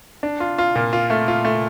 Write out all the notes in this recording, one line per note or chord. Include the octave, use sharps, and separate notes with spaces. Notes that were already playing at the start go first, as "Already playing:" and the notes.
D4
F4
F4
A#2
F4
A3
F4
A3